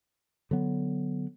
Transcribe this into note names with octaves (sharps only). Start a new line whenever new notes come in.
D3 F#3 B3